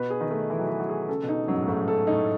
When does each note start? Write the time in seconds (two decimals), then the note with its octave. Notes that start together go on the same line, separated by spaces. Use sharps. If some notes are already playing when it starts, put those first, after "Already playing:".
Already playing: B2 B4
0.10 G#4
0.21 D#3
0.30 A3
0.50 E3 E4
0.59 F#3
0.67 E3 B4
0.80 F#3
0.89 G#4
1.09 C#3 A4
1.23 B2
1.29 D#4
1.46 F#2 F#3
1.53 G#2
1.62 A2
1.67 G#2 A3
1.82 F#2
1.88 A4
2.07 A2 D#4